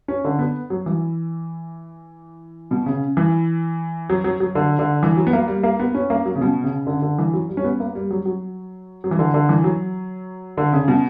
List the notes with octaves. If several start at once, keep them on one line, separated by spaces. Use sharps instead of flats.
C#4
D3
B3
F#3
E3
B2
C#3
E3
F#3
F#3
F#3
D3
D3
E3
F#3
B3
A#3
G3
A#3
B3
C#4
A#3
F#3
C#3
B2
C#3
D3
D3
E3
F#3
G3
C#4
B3
A#3
G3
F#3
F#3
F#3
E3
D3
D3
E3
F#3
D3
C#3
B2